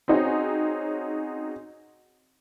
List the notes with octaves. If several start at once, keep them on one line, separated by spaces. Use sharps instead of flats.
C4 C#4 D#4 F#4 G#4